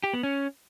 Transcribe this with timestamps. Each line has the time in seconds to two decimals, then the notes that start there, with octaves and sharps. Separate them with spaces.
0.04 G4
0.13 B3
0.23 C#4